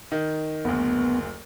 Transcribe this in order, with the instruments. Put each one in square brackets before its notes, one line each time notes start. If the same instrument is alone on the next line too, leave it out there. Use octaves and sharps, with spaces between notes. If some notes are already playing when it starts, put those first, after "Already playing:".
[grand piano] D#3
[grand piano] F#1 D2 [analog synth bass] B3